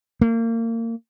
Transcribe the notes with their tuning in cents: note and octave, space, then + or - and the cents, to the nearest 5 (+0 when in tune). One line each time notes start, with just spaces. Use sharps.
A#3 -30